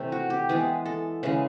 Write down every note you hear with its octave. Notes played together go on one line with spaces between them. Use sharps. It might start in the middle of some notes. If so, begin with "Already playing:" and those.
Already playing: C3 E3 A3
F#4
G4
E3 G#3 B3 G#4
A4
C#3 E3 G#3